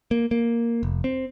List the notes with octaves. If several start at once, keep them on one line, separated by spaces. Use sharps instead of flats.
A#3
A#3
F1
C4